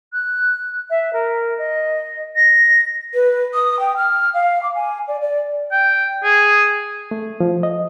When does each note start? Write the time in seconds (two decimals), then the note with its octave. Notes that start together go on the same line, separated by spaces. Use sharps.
0.13 F#6
0.90 E5
1.13 A#4
1.58 D#5
2.36 A#6
3.14 B4
3.54 D#6
3.80 G5
3.97 F6
4.34 F5
4.63 D6
4.75 G#5
5.08 D5
5.21 D5
5.72 G5
6.24 G#4
7.11 A3
7.40 F3
7.63 D#5